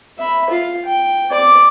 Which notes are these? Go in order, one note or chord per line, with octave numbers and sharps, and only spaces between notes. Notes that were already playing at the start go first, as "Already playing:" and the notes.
E5 B5
F4 F5
G5
D5 D6